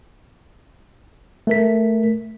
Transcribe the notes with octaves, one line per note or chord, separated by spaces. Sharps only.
A3 A#4 B6